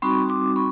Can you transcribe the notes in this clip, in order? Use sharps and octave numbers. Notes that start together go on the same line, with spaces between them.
G3 C4 D#4 F#4 B5 C#6
C6 D6
B5 C#6